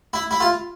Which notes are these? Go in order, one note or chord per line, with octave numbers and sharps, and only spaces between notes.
E4
E4
F4